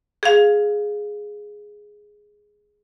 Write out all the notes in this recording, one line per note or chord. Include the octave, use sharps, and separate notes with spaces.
G#4 F5